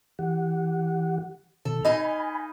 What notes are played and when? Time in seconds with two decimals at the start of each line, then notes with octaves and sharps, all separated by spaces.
0.19 E3 G4 F#5
1.65 B2 D#3 A4
1.85 D#4 D#5 F5 G#5 B5